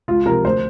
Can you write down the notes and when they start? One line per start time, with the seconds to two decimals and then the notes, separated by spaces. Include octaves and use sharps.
0.08 C#2 F4
0.26 C3 F3 A#4
0.45 D2 C5